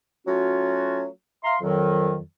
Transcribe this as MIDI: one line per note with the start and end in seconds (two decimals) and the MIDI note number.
0.27 1.06 54
0.27 1.06 57
0.27 1.06 61
0.27 1.06 65
0.27 1.06 66
1.43 1.56 76
1.43 1.56 77
1.43 1.56 82
1.43 1.56 84
1.61 2.19 41
1.61 2.19 51
1.61 2.19 54